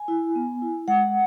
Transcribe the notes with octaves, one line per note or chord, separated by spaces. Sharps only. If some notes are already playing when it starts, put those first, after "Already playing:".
Already playing: G#5
E4
B3
E4
G#3 F#5